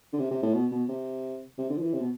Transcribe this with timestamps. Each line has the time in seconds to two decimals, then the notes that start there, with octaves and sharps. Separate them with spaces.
0.13 D3
0.20 C3
0.31 C3
0.43 A2
0.54 B2
0.72 B2
0.89 C3
1.59 C3
1.70 D3
1.78 F3
1.82 E3
1.93 C3
2.01 B2